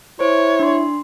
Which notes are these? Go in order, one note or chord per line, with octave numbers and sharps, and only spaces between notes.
E4 C5 C#5
D4 C6